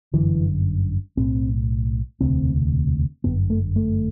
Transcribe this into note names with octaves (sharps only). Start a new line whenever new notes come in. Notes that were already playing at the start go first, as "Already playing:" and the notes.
G1 F#2 D3 E3
B1 A2 C4
E1 D2 C3 C4
G1 F#2 D3 B3
A3
A3